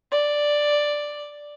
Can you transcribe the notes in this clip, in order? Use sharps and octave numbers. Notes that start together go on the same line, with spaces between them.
D5